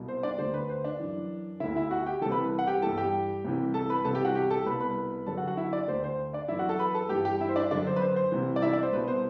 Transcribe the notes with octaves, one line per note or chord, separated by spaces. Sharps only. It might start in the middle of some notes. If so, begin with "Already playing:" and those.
Already playing: C2 B2
C5
D4 D5
D2 D3 C5
B4
C5
D4 D5
F#2 E3
D2 D3 E4 E5
E4 E5
F#4 F#5
G4 G5
C2 C3 E3 A4 A5
B4 B5
F#5
G4 G5
G2 E3 A4 A5
G4 G5
C2 C3 E3
A4 A5
B4 B5
C2 C3 E3 A4 A5
G4 G5
F#4 F#5
G4 G5
A4 A5
C2 B2 B4 B5
B4 B5
F#2 D3 A4 A5
F#4 F#5
F#4 F#5
E4 E5
D4 D5
D2 D3 C5
C5
D4 D5
F#2 E3 E4 E5
F#4 F#5
A4 A5
B4 B5
A4 A5
G2 E3 G4 G5
G4 G5
E4 E5
C5
D4 D5
F#2 D3 D4 D5
C5
B4
C5
C5
C2 C3 E3
D5
E4 E5
D4 D5
C5
C2 B2 B4
C5